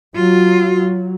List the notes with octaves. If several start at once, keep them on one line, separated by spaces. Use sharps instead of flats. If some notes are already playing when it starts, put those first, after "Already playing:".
F#3 F4